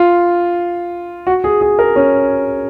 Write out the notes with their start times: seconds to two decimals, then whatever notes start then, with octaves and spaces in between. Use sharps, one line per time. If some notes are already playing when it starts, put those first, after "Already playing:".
Already playing: F4
1.27 F#4
1.44 G#4
1.61 G#4
1.79 A#4
1.96 C#4